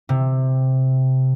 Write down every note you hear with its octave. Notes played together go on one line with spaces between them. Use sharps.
C3